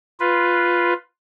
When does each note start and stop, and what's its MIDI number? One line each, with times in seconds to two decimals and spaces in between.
0.20 0.93 65
0.20 0.93 71